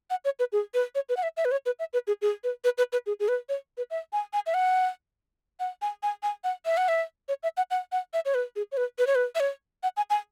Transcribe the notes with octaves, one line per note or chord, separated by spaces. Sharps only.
F#5
C#5
B4
G#4
B4
C#5
B4
F#5
E5
E5
B4
C#5
B4
E5
B4
G#4
G#4
B4
B4
B4
B4
G#4
G#4
B4
C#5
B4
E5
G#5
G#5
E5
F#5
F#5
G#5
G#5
G#5
F#5
E5
F#5
E5
C#5
E5
F#5
F#5
F#5
E5
C#5
B4
G#4
C#5
B4
B4
C#5
B4
E5
C#5
F#5
G#5
G#5